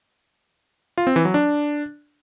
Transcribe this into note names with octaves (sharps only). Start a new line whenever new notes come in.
F4
C4
E3
F#3
D4